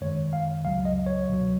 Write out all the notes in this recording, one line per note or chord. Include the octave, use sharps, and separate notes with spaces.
F#2 D#3 G#3 C#5
F5
C#2 C#3 F#3 F5
D#5
C#5
C#2 B2 F#3